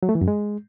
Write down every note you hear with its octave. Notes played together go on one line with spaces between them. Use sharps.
F#3
A3
E3
F#2
G#3